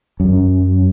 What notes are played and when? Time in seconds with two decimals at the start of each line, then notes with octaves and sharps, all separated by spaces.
0.20 F#2